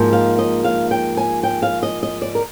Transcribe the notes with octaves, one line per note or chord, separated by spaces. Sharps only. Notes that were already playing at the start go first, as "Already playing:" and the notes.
Already playing: G#2 F3 A#3 D#4
F5
D#5
F5
G5
G#5
G5
F5
D#5
D#5
D5
A#4